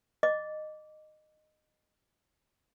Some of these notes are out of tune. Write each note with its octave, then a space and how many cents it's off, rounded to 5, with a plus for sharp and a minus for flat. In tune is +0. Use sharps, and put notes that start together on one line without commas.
D#5 -15 D6 -15